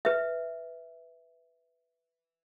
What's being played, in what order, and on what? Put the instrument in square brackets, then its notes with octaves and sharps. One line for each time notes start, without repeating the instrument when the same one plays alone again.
[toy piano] B4 E5